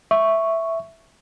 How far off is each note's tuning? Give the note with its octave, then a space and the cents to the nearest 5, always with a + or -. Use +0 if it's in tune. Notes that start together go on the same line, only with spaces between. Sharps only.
E5 +0 C#6 +0